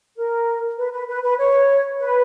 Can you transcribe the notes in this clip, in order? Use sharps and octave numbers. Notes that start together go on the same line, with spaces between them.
A#4
B4
B4
B4
B4
C#5
B4